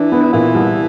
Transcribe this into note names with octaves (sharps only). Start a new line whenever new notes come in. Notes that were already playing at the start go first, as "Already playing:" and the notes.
Already playing: E3 D4
B3
A#2 E3
C2